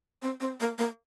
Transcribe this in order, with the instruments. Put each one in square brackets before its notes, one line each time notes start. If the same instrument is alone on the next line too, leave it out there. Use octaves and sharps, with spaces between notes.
[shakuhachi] C4
C4
A#3
A#3